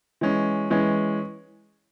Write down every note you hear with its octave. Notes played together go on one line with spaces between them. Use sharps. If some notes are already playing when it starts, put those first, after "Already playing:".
E3 G#3 C#4
E3 G#3 C#4